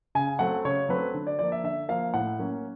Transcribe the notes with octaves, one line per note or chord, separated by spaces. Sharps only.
C#3 G#5
F#3 A3 C4 F#5
C#3 C#5
F#3 A3 C4 B4
D3
D5
F3 A#3 D5
E5
D3 E5
F3 A#3 F5
A2 F#5
F#3 A#3 C#4